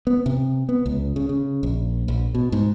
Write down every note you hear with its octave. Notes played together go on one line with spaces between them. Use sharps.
B3
C3
B3
C#2
C#3
C#3
A#1
A#1
B2
G#2